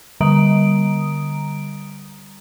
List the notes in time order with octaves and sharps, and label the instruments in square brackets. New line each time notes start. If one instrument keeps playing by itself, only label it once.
[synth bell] D3 G3 A#5 D#6 D7